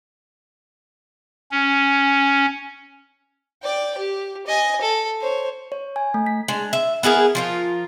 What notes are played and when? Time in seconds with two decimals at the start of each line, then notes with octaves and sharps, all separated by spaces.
1.51 C#4
3.63 D5 G5
3.97 G4
4.47 D#5 G#5
4.81 A4
5.20 C5 C#5
5.72 C#5
5.96 G#5
6.14 A3
6.26 B6
6.48 G#3 D4
6.73 E5
7.03 B3 E4 G#4 A#4
7.35 F3 F4 A#4